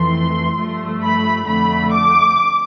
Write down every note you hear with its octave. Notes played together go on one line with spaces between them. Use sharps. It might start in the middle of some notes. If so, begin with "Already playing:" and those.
Already playing: F2 E3 A3 C6
G2 F3 A3
B5
F2 D3 A3 B5
D6